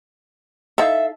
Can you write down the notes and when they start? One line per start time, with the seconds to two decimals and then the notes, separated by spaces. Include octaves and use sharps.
0.78 D#4 E4 A4 E5 F5